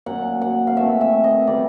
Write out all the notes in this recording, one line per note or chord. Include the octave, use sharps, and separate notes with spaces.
A#2 F#3 A#3 C#4 F#5
F#5
F5
E3 A3 C4 E5
E5
D#5
C3 E3 G3 B3 D5